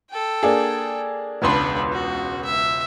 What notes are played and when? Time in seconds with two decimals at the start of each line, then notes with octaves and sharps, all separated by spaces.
0.10 A4 G5
0.43 A#3 D4 G#4
1.42 E1 C#2 D4 B4 C6
1.92 F#4
2.45 E5